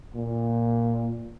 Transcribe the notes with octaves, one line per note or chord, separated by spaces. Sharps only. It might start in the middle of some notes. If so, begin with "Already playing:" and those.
A#2